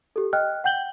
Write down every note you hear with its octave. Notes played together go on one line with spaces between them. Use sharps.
G4 A4
D#5 G5 F6 F#6
F#5 G5 G6 F#7 G7